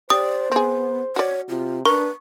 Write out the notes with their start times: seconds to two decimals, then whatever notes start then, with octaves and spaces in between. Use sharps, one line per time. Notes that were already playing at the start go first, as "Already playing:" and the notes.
0.10 G4 C5 D5 D#6
0.52 B3 C4 G#4
1.16 F#4 C#5 D5
1.49 C3 F4
1.85 D4 A#4 B4 C#6